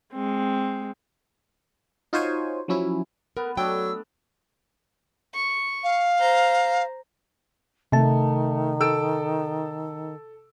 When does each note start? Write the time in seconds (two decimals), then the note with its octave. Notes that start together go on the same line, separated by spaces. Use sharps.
0.13 G#3 C4
2.13 D#4 F4 F#4 C5 C#5 G#5
2.68 F3 F#3 C#4 E4
3.37 B3 A#4 B4
3.57 F#3 A3 D4 G5 E6
5.35 C#6
5.84 F5
6.19 C5 A#5
7.92 C3 D#3 A3 A5
8.80 A4 E6 D7